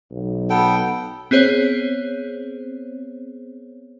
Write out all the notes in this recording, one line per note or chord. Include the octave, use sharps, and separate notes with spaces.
B1
B3 A4 G5
B3 C4 G#4 C5 C#5